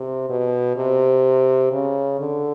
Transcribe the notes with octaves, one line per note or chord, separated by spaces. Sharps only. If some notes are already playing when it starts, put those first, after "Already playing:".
Already playing: C3
B2
C3
C#3
D3